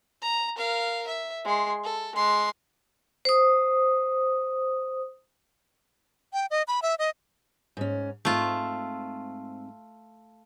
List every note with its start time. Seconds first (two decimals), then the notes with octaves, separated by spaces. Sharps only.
0.22 A#5
0.56 A#4 F5
1.07 E5
1.45 G#3 C6
1.84 A4
2.15 G#3 C6
3.25 C5 D#6
6.33 G5
6.51 D#5
6.68 B5
6.82 E5
6.99 D#5
7.77 G#2 C#4
8.25 G#2 A3 C4 F4